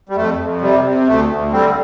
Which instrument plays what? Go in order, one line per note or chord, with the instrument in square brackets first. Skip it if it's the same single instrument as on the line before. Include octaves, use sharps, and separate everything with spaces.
[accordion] G3
F2 A3
F2
C3 G3
C3
D2 A3
D2
D3 G3 C4